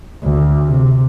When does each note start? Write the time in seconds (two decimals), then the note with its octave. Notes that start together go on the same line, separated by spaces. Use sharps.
0.23 D2
0.67 C3